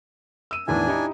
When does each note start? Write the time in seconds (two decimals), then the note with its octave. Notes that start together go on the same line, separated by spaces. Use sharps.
0.51 E6 D#7
0.68 E2 A2 D#3 D4 G#5
0.87 D#4 E4 G4